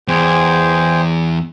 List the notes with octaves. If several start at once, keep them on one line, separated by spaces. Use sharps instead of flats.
E2 G#4 C5 G5